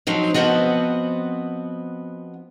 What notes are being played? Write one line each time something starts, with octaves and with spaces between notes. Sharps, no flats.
F3 F#3 C4 D#4
F3 B3 C4 F#4 D#5